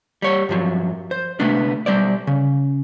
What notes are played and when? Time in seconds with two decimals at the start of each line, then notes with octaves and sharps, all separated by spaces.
0.22 G3 C#5
0.49 G2 F3 F#3
1.11 C5
1.40 C3 A3 B3 D4
1.86 B1 G3 C5 D5
2.27 C#3